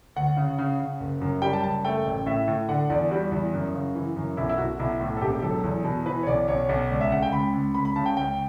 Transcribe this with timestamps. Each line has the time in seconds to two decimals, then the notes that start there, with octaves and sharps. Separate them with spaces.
0.16 D2 F#5
0.37 C#3
0.58 C#3
0.80 C#3
1.00 F#1
1.21 F#2
1.42 G3 G5
1.53 A5
1.63 F#1 A5
1.85 A3 G5
2.06 A1
2.26 A2 E5
2.48 A2
2.69 D3 F#5
2.90 E2 D5
3.11 G3 F#4
3.32 E2
3.53 F#2
3.74 C#3
3.95 E3
4.16 F#2
4.37 B1 E4
4.49 E4
4.58 B1 F#4
4.79 B1 E4
5.00 A2
5.17 A4
5.21 E1 G4
5.42 F#3 A4
5.64 E2
5.84 B2
6.06 E3 B4
6.23 C#5
6.27 B1 D5
6.48 B1 C#5
6.69 B1
6.90 C#2 D5
7.01 E5
7.11 C#3 F#5
7.22 G5
7.33 C#2 B5
7.54 C#2
7.75 C#2 B5
7.85 B5
7.96 C#3 A5
8.06 G5
8.17 C#2 G5